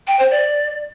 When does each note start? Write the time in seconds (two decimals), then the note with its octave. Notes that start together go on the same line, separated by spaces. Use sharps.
0.08 G5
0.19 C5
0.31 D5